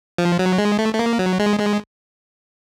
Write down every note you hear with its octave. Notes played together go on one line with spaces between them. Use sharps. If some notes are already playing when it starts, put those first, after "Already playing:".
F3
F#3
G#3
A3
A3
A#3
F#3
G#3
G#3